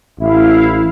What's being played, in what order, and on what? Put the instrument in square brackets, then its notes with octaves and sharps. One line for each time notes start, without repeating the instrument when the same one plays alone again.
[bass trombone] A1 [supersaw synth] E4 F5